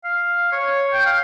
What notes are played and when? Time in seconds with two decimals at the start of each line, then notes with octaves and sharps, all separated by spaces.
0.05 F5
0.52 C#5
0.93 G5
1.06 F5